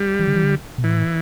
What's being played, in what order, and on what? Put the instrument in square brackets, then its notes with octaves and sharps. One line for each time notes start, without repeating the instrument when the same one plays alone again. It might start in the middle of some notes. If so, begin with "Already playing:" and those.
Already playing: [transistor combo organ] G3
[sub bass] E3
D3
E3
D3
B2
[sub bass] A2 [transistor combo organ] E3